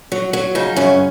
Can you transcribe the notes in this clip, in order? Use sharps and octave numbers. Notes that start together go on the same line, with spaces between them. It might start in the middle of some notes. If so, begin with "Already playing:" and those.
F#3
F#3
C#3 D#4
F#2 C#4